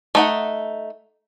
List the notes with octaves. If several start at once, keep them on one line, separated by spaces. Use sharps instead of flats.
A3 D#4 F#5